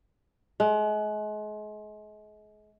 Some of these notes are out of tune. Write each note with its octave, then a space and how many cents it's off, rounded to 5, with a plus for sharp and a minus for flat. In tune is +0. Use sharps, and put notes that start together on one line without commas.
G#3 +35